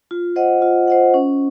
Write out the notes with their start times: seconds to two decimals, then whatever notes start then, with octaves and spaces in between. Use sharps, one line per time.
0.11 F4
0.36 C5 D#5 F#5
0.62 F4
0.87 C5 D#5 F#5
1.14 C#4